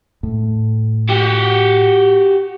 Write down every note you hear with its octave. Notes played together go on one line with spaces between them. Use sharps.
A2
F#4 G4